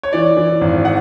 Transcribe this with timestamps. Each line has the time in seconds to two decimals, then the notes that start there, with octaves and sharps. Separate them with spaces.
0.03 C#5
0.13 E3 D5
0.37 E3
0.61 G#1
0.85 F#5